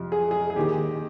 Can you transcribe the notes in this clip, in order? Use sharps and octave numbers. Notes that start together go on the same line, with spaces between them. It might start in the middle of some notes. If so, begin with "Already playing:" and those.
Already playing: F2 C3 F3
G#4
G#4
G#4
D#2 D#3 G4